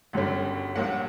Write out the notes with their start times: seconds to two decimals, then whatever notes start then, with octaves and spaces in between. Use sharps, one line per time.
0.13 G1 F#2 C#3 G3
0.76 A#1 A#2 G3 F#5